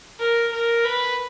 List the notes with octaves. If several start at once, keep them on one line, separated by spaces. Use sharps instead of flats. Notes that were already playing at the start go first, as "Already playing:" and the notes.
A#4
A#4
B4